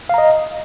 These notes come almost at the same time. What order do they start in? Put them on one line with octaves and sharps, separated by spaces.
F5 A#5 D#5